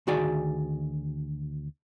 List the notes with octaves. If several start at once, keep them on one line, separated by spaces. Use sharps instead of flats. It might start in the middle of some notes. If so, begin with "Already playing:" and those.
D2 D#3 F#4 G#4 D5 G#5